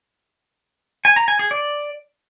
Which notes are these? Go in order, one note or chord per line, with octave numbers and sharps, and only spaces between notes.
G#5
A#5
G#5
G#4
D5